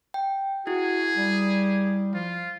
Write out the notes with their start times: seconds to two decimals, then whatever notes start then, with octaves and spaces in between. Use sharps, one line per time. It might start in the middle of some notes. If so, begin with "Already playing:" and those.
0.14 G5
0.67 E4 F#4 G#4
1.17 G3
2.14 F3 F4